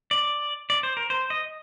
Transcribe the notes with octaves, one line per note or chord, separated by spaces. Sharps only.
D5
D5
C5
A#4
C5
D#5